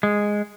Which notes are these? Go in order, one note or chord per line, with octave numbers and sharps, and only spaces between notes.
G#3